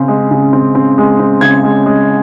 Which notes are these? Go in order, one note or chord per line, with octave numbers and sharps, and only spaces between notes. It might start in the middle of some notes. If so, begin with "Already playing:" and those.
Already playing: C#3 C4
G#3
C#3
C4
C4
G#3
C4
C#3 G#6
G#3
G#3